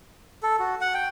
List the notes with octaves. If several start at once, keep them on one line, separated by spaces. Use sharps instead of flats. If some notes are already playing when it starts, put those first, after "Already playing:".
A4
F#4
F#5
G5